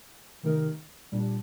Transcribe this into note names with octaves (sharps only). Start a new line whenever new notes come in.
C3 D#3 A3 D#4 A#4
A#2 G3 D4